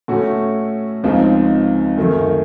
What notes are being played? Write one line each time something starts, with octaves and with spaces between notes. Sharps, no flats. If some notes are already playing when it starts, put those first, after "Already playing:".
A2 A3 C#4 F#4
C#2 C#3 F3 C4 D#4
F#2 D#3 A3